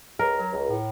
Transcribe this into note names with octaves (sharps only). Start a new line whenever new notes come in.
C#2 A#4
F#3
C#2
A2